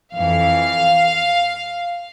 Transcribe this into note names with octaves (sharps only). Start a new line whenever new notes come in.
F2 E3 F5